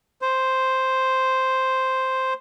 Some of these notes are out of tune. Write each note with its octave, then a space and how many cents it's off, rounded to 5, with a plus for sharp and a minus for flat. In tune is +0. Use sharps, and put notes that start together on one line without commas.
C5 +0